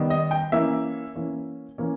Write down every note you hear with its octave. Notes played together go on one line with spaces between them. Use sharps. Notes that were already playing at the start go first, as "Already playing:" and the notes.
Already playing: D#3 G3 B3
D#5
G5
E3 A#3 C#4 E5
E3 A#3 C#4
E3 A#3 C#4